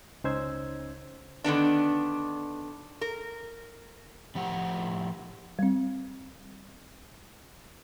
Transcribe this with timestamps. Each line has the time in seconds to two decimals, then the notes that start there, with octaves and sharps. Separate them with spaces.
0.24 C#2 C#4 D#4 C5 E6 G#6
1.44 D3 D#3 B3 D4
3.01 A#4
4.35 A2 F3 G4 F#5
5.59 G3 C4